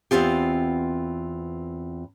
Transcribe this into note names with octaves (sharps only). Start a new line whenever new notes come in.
E2 B3 C4 F4 G4